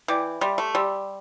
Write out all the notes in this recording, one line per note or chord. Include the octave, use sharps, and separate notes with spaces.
E3 D5 G5 D6 G6
G3 G4 E5 C6
A3
G3 G4 D5 C6 E6